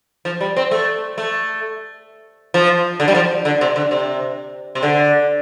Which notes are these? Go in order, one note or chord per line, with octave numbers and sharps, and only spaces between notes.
F3
G3
C4
A3
A3
F3
D3
G3
F3
D3
C3
D3
C3
C3
D3